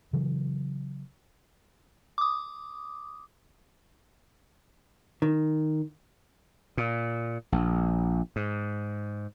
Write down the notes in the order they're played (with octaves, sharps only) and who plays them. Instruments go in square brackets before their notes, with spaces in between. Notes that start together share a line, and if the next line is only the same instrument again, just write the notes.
[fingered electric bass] C#3 E3 F#3
[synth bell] D6 D#6
[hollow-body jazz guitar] D#3
[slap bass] A#2
A#1
G#2